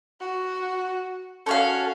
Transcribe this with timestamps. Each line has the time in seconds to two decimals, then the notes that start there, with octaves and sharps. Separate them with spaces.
0.20 F#4
1.46 C#4 F#4 A4 C#5 F5